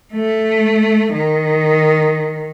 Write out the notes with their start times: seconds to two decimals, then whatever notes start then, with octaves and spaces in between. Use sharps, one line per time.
0.13 A3
1.14 D#3